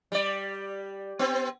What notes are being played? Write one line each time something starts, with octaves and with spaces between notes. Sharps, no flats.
G3 D5
B3 C4